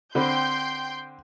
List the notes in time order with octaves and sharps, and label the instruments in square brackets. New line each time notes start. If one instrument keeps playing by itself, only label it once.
[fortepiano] D3 C4 B5 [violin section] G5 C6 G6